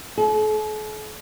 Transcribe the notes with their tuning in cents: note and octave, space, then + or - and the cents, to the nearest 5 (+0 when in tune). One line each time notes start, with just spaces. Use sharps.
A4 -45